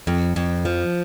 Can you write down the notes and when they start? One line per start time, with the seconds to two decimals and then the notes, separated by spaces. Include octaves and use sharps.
0.07 F2
0.36 F2
0.65 F3